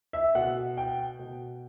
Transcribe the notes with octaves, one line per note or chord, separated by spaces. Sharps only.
E5
B2 F#5
G5
B2